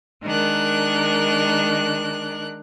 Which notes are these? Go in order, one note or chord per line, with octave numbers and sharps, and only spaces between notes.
D#3 G#3 D4 A#4 F#6